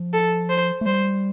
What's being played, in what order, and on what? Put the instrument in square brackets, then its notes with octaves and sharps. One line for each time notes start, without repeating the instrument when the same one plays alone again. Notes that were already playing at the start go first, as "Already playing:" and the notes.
Already playing: [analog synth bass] F3
[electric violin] A4
C5
[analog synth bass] A3
[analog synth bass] G3 [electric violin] C5